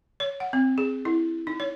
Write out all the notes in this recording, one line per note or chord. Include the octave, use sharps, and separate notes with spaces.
C#5
F#5
C4
G#4
E4
D#4
C#5